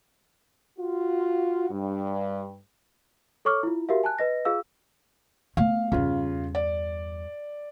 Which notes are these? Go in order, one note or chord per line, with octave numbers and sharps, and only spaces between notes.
F4 F#4
G2
A4 C#5 C#6 D6 F6
E4 F4
F#4 G4 A#4 E5 F5
G#5 A5 F#6
B4 D#5 A#6
F4 G#4 F5 E6
A3 B3 F5
E2 G2 C#3 F4
D5